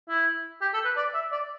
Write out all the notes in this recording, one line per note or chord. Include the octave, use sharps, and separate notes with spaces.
E4
G4
A4
B4
D5
E5
D5